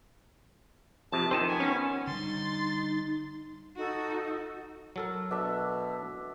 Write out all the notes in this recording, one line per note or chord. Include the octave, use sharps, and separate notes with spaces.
F2 C3 A5
F2 D#3 C4 D#4 C5 G#5 A5
B3 G#5
C#4
D3 G3 D#4 C6 A6
D#4 F#4 A4
F#3 A4 A#4
B2 D4 E5